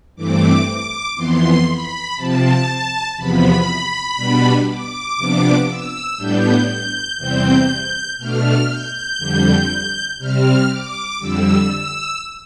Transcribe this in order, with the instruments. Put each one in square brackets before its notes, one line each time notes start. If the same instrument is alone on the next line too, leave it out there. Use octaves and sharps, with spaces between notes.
[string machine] G2 E3 A3 C4 D6
D6
F2 E3 B3 C6
B5
C3 F3 C4 A5
E2 C3 F3 B3 B5
B2 G3 B3 D4
D6
C3 F3 B3 D4
E6
A2 G3 B3 D4 G6
G6
E2 C3 G3 C4 G6
B2 A3 D4 F6
G6
F2 D3 G3
C3 G3 C4 F6
D6
F2 D3 G3 E6
E6